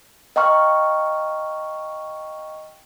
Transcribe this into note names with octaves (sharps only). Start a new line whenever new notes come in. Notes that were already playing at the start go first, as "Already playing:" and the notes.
D#5 F5 G5 A#5 C#6 F6